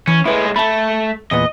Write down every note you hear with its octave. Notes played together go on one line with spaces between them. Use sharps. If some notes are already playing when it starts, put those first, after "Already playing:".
E3 C#4
A2 G#3 E4 B4
A3 A5 B5
E2 A#2 B3 D#5